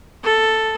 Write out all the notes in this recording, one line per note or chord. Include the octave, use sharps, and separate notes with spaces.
A4